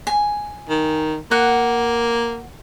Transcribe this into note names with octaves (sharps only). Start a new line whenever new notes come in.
G#5
D#3
A#3 F#5